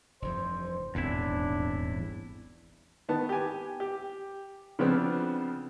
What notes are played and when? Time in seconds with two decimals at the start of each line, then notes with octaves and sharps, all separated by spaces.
0.22 F1 G2 E3 C5
0.95 D#1 G#1 E2 C4 D4 E4
3.09 D#3 B3 A5
3.29 G4 G#5
3.80 G4
4.79 C#3 F3 B3 C4 D4